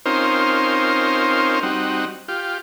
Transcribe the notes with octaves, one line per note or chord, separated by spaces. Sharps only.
C4 C#4 D#4 F4 A#4 C5
G3 C4 D#4 F#4
F4 G4